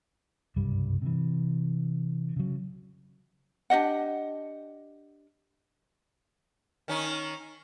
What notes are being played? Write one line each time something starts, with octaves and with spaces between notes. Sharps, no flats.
F#1 C2 G2 G3
C3 E3
C#3 F#3
D4 G4 D#5 F#5
D#3 C#4 D#4